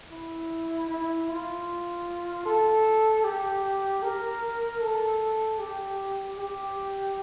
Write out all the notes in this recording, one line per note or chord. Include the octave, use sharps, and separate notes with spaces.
E4
E4
F4
A4
G4
A#4
A4
G4
G4